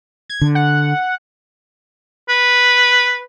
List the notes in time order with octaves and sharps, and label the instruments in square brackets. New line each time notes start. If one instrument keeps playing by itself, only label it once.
[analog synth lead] G#6
[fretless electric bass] D3
[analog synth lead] F#5
[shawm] B4